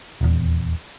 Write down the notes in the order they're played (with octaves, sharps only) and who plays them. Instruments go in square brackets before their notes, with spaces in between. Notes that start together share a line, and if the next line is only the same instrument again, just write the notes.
[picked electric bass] D#1 E2